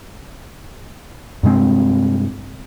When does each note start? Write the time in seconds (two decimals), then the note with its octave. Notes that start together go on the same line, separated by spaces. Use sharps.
1.43 G2 C3 G#3 C4